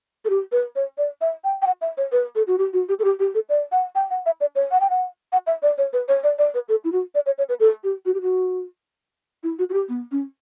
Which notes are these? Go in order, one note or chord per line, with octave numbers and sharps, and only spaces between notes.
A4
G4
B4
C#5
D5
E5
G5
G5
F#5
E5
C#5
B4
A4
F#4
G4
F#4
G4
A4
G4
G4
A4
D5
F#5
G5
F#5
E5
D5
C#5
F#5
G5
F#5
F#5
E5
D5
C#5
B4
C#5
D5
D5
B4
A4
E4
F#4
D5
C#5
C#5
B4
A4
G4
F#4
G4
F#4
E4
F#4
F#4
G4
B3
C#4